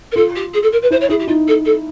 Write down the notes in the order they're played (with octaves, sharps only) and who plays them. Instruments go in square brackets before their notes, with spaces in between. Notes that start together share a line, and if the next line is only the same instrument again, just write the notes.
[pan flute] A#4
[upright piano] F4 [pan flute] A4
[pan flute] G4
G#4
A4
A#4
B4
[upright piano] E4 [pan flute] C5
[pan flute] C#5
[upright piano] E4 [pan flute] G#4
[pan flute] G4
[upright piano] D#4 [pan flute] F4
[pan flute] A4
A4